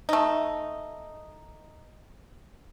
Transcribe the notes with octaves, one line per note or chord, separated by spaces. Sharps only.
A3 D#4